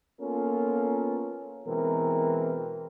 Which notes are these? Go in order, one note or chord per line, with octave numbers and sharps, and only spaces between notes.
A#3 B3 C#4 F4 A4 A#4
B2 E3 G#3 C4 A#4